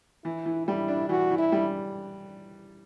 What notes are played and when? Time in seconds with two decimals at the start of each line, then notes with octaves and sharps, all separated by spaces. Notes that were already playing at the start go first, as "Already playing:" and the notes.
0.25 E3 E4
0.46 E3
0.67 G3 E4
0.88 D4
1.09 E3 F#4
1.31 E3
1.38 E4
1.52 G3